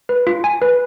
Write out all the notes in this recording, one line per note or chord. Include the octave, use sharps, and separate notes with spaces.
B4
F4
G#5
B4